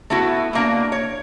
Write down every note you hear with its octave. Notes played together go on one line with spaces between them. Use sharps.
A3 B3 E4 F#4
B2 A#3 D4
C#5